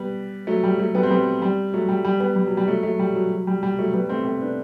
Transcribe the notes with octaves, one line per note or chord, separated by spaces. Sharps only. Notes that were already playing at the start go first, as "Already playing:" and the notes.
Already playing: G3 B3
F#3 A3
G3
F#3 A3
G3 B3
C4
G3 B3
G3
F#3 A3
G3
G3
G3 B3
G3
F#3
G3
F#3 A3
F#3 A3
G3
F#3
F#3
G3
G3
F#3 A3
G3 B3
A3 C4
A3 C4
B3 D4